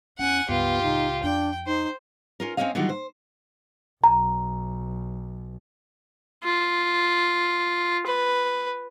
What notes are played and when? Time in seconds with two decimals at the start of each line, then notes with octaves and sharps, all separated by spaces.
0.19 E2 C#4 E4 F#5 G#5
0.49 C#2 G2 B3 F4 G4
0.82 C#2 A2 D#4
1.23 F2 C#4 D4 G5
1.67 D#4 C5
2.40 C#4 F4 A#4
2.57 C4 C#4 E4 C#5 D#5 F5
2.75 D3 D#3 F#3 G3 F4 F#4
2.89 C5
4.04 B1 A#5
6.44 F4
8.06 B4